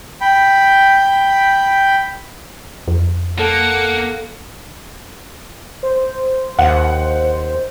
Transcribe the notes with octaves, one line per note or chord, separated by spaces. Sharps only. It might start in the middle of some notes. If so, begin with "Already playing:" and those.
G5 B5
F2
A#3 A4 F#5
C5
D#2 F#5